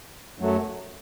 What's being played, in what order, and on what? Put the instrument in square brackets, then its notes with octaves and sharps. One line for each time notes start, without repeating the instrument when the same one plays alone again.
[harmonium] F#2 F#3 A3